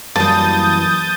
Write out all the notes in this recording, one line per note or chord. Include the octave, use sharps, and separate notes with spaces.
F#2 E3 G3 A#3 A5 D#6 G6 A6